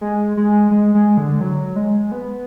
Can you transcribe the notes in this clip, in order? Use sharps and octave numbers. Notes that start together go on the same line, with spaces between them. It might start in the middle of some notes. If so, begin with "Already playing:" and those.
G#3
G#3
G#3
G#3
D3
F#3
G#3
B3